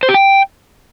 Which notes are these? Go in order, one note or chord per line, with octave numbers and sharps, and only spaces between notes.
C5
G4
G5